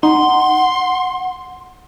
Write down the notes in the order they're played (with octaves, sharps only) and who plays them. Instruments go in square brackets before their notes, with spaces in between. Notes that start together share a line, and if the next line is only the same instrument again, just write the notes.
[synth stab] D#4 [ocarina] F#5 [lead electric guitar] C6